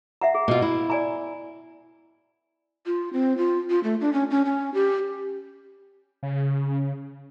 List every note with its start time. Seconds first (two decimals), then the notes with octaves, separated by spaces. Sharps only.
0.21 E5 F#5 A#5
0.35 G#4
0.48 B2 F4
0.62 E4
0.90 D5 G#5 A#5
2.86 F4
3.13 C4
3.38 F4
3.70 F4
3.84 A3
4.01 D4
4.13 C#4
4.31 C#4
4.45 C#4
4.74 G4
6.23 C#3